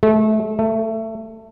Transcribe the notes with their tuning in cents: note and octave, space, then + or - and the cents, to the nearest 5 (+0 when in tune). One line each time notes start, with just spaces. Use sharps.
A3 -25
A3 +20